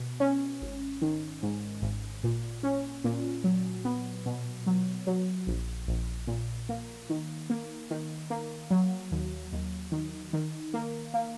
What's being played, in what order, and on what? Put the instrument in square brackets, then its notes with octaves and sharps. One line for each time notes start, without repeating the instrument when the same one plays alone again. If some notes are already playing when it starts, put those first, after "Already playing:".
Already playing: [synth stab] B2
C#4
G#1
D#3
G#2
G#1
A#2
C#4
A#2
F#3
B3
B2
F#3
F#3
A#1
A#1
A#2
A#3
D#3
A#3
D#3
A#3
F#3
D#2
D#2
D#3
D#3
A#3
A#3